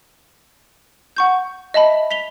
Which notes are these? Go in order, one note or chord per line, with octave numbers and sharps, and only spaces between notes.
F#5 C#6 G6
D#5 E5 A5 B5
B6 F7 G7